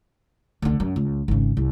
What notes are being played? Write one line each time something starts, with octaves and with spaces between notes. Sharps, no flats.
D2 D3
F#2
C#2
G#1 C#3
C2